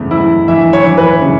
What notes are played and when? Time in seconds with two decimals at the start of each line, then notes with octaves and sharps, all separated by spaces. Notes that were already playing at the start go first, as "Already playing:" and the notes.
Already playing: E2 C#3 A3 B3
0.11 E2 E4
0.48 E3 E5
0.73 C#5
0.84 E3
0.97 B4
1.22 C#3